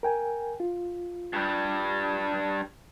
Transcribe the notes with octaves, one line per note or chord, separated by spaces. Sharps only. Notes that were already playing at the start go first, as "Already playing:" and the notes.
A#4 G5 G#5
F4
G2 G3